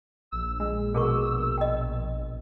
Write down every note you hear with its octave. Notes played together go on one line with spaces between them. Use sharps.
A#1 E6
G#3
B2 G#4 A#4 C#6
D#5 G5